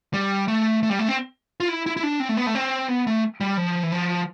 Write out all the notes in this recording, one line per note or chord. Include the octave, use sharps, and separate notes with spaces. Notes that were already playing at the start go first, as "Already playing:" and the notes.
G3
A3
A3
G3
A3
C4
F4
E4
E4
E4
D4
C4
A3
B3
A3
C4
B3
A3
G3
F3
E3
F3